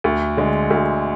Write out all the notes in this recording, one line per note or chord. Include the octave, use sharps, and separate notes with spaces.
D2
D3 G#3
D2